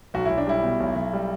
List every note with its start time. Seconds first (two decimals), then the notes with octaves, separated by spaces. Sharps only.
0.14 B1 F#4
0.25 B1 E4
0.38 D4
0.47 G3 E4
0.63 B2
0.80 B1
0.96 B1
1.13 G3